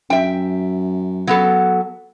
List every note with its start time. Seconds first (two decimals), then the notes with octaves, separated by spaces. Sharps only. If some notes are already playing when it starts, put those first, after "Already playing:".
0.10 F#2 E5 G5
1.27 F#3 B3 A4